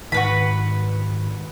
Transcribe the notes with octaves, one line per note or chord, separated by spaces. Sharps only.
G#2 D#3 F#4 B4 B5